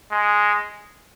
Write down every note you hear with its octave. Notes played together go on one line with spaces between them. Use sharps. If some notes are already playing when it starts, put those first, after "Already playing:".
G#3